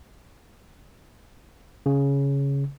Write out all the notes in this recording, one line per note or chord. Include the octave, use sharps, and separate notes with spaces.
C#3